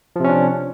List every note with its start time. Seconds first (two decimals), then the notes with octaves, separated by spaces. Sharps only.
0.16 F3
0.20 C3
0.24 C#4
0.29 D4